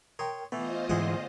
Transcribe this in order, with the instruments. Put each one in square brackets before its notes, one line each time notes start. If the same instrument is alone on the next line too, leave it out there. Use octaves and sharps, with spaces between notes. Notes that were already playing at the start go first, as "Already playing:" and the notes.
[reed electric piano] A#4 G5 [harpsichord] C#5 C6 D#6
[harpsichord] E3 A3 [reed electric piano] B3 [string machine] F4 C5 D#5
[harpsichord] D2 G#4 F#5 [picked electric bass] G#2 E3 G#3